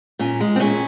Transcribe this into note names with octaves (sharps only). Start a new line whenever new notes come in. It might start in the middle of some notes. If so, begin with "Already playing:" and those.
A#2 C#4
G#3
C4
A#2 C#4